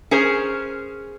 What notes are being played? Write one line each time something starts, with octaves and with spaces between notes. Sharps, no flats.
C#4 G#4 A#4 C5